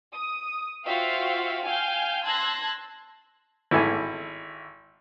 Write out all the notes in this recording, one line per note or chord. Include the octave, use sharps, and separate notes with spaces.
D#6
F4 F#4 C5 E5 F5 G5
F5 G5 G#5 F6 G6
A5 C6 E6 F#6 G#6 A#6
G#1 E4 A4 G#5